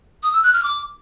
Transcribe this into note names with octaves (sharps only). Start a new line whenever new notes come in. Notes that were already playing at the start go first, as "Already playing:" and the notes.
D#6
E6
F#6
F6
D6